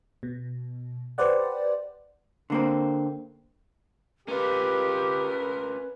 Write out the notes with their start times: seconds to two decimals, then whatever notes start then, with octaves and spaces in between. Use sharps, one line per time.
0.23 B2
1.18 G4 B4 C5 D5 F#5
2.50 D3 A#3 C4
4.28 C#4 F4 G4 A#4 B4